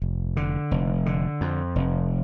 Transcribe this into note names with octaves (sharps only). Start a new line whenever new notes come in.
F1
D3
F1
D3
F2
F1